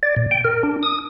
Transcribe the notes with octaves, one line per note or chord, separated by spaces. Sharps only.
D5
A#2
G5
A#4
D4
D#6